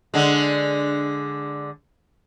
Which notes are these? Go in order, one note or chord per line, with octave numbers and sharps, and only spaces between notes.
D3 G#3